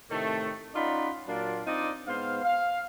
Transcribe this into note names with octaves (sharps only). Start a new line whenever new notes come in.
A2 C3 D#3 A3
C#4 D#4 F4 D5 F#5 B5
A#2 F#3 A#3 D4 F4
C4 D4 D#4 F4 D5 D#5
G#2 B3 C5 F5
F5